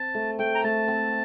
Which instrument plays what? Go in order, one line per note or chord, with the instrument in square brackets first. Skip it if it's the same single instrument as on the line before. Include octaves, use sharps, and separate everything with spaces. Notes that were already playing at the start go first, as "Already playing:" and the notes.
Already playing: [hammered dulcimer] C4 [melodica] A5
[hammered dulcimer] A3
[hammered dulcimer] A3 [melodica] G5
[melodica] A#5
[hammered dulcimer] A3 [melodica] A5
[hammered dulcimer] C4